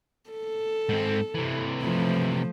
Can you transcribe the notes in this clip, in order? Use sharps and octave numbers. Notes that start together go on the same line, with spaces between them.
A4
G#2 C4
C3 E3
F3 A3